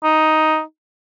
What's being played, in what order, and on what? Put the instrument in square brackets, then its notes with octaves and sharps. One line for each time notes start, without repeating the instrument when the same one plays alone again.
[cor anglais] D#4